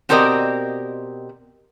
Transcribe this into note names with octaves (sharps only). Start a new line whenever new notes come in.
B2 C4 G4 A#4 D5 D#5